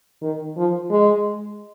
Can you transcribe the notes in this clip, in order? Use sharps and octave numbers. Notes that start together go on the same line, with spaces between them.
D#3
F3
G#3